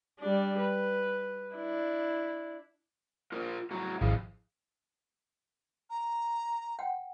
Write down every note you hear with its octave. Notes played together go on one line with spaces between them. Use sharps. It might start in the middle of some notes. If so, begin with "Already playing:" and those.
G3 D4
B4
D4 E4
F4 A#4 C5
A2 F#4 A#5
G#1 F3 E4 G#4 F5
A#5
F#5 G5